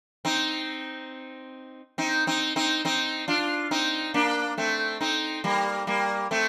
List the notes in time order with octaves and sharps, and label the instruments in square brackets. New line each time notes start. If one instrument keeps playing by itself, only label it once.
[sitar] C4 D#4
C4 D#4
C4 D#4
C4 D#4
C4 D#4
D4 F4
C4 D#4
A#3 D4
A3 C4
C4 D#4
G3 A#3
G3 A#3
A3 C4